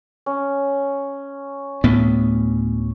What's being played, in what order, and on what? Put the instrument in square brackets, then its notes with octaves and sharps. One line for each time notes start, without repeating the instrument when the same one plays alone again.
[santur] C#4
[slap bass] D2 A2 B3